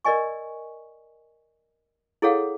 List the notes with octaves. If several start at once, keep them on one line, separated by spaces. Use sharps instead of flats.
A#4 D5 D#5 G#5 C#6
E4 G#4 A4 C#5 F5 F#5